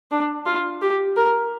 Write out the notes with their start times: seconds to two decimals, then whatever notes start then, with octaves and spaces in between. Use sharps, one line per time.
0.11 D4
0.46 F4
0.82 G4
1.17 A#4